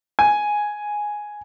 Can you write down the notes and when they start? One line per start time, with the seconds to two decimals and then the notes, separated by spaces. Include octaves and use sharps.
0.19 G#5